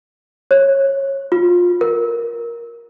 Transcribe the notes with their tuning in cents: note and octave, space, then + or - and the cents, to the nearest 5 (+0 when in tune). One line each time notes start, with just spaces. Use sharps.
C#5 -20
F4 +20
A#4 +10